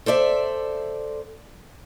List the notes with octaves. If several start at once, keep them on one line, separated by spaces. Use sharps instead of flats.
A4 C5 D5 E5